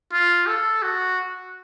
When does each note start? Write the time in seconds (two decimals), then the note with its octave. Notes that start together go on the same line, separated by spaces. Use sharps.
0.13 F4
0.47 A4
0.83 F#4